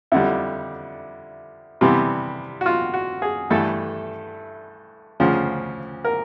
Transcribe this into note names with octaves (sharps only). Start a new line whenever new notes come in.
F2 D3 G3 E4
C3 E3 G3 B3
F#4
F4
F#4
G#4
G2 E3 A3 A4
D2 C#3 F3
A#4